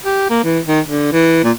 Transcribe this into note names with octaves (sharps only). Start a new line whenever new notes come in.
G4
A#3
E3
D#3
D3
E3
A#2